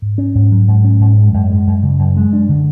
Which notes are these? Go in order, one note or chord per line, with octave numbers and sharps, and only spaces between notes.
G#2
C#4
G#2
F#3
G#2
C#4
G#2
G#3
F#2
G#3
F#2
C#3
F#2
G#3
D4
D3